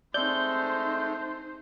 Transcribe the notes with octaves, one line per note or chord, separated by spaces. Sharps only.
G#3 A3 C4 D#4 A4 C5 D5 G6